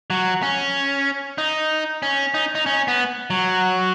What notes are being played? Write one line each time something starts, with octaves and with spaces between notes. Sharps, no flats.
F#3
C#4
D#4
C#4
D#4
D#4
C#4
B3
F#3